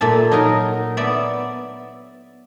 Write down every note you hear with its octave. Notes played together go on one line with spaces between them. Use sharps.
A#2 A4 E5 A5
F#3 D#4 A#4
B3 D5 E5